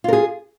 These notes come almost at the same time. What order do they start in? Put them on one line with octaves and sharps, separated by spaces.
F4 A#4 G#4